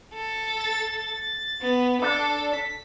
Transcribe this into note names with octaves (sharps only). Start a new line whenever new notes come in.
A4
A6
B3
D4 A4
B6